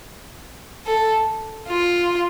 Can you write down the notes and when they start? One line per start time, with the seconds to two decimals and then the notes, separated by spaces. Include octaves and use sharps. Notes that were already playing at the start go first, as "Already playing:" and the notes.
0.86 A4
1.69 F4